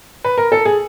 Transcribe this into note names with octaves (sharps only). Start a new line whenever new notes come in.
B4
A#4
A4
G#4